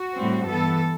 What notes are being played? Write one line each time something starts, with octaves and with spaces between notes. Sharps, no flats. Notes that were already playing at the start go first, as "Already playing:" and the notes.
Already playing: F#4
A2 G3 C4
G2 E3 B3 A4